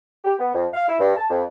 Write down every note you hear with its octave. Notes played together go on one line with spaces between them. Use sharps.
G4
B3
F2
F5
E4
G2
A5
F2